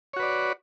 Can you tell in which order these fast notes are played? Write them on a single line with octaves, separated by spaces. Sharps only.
C#5 F#4 B4 D5